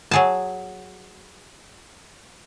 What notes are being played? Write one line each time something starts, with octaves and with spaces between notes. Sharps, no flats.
F#3 G#4 A5